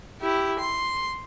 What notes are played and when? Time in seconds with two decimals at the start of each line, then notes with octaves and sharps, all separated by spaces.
0.21 E4 G4
0.59 C6